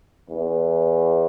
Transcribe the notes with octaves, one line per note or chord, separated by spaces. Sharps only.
E2